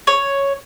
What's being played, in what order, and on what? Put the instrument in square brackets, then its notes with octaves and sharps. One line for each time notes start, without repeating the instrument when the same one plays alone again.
[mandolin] C#5